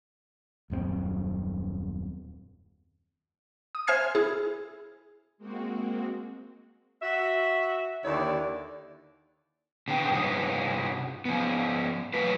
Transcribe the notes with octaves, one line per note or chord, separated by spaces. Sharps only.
D#1 F#2 A3 C4
D#6
C5 E5 G#5 F6 G#6 C7
E4 G#4
G#3 A#3 C4 F#4
F#4 E5
D#2 D3 D#3 E4 D5
B2 D3 D#3 B3 G5
G2 C3 D#4 F#4
F3 B3
F#3 A3 B4